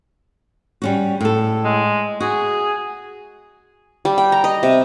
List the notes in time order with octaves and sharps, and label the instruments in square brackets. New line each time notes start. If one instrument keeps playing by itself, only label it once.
[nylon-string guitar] G3 C#4 F#4
A2 A4
[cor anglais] G#3
[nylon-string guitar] F#4 [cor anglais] G#4
[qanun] G3
G5
A#5
D#5
C3